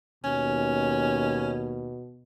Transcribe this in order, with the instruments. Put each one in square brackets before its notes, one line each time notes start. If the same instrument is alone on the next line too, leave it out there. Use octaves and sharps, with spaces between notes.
[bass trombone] D#2 [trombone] B2 [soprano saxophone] C#4